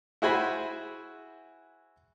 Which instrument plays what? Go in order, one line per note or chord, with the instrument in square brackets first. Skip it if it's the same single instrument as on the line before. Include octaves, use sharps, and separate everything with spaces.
[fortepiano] E4 F#4 G#4 C5 G#5 B5